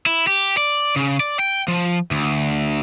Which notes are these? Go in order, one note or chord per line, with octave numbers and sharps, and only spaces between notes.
E4
G4
D5
C#3
D5
G5
F3
D2